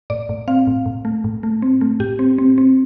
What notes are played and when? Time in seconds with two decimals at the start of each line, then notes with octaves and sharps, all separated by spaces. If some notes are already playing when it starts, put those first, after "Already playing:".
0.10 A2 D5
0.29 A2
0.48 C4 F5
0.67 A2
0.86 A2
1.05 A3
1.24 A2
1.43 A3
1.62 C4
1.81 A3
2.00 A2 G4
2.19 C4
2.38 C4
2.58 C4